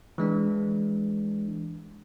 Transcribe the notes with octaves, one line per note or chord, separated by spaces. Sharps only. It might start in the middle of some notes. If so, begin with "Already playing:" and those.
E3 G#3 D4